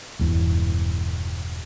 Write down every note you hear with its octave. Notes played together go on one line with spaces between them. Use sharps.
E1 E2 G2